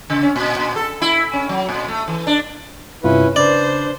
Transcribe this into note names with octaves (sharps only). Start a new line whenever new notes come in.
C#3
C#4
A#2
A#2
A4
E4
C#4
F#3
A#2
A3
E3
D4
G2 C3 C#4 E4 F4 B4
C#3 D4 B4 C5 D5